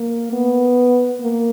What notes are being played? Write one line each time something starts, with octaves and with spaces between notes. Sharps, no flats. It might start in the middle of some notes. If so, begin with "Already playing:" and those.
Already playing: A#3
B3
A#3